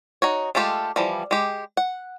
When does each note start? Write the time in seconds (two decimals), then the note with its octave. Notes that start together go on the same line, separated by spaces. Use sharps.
0.22 D#4 F#4 C#5
0.55 G#3 A3 F4 G4 A4
0.96 E3 F3 G3
1.31 G#3 G4
1.77 F#5